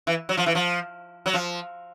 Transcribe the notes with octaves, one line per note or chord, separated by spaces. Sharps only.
E3
F#3
F3
E3
F3
F#3
F3